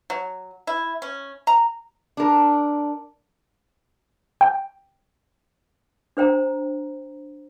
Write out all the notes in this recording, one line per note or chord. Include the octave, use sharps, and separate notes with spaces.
F#3
E4
C#4
A#5
D4 A#4
G5
D4 C5 G5 A#5